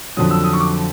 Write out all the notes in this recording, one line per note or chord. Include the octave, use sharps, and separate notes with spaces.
F2 D3 F#3 D#6
E6
D#6
C#6
D6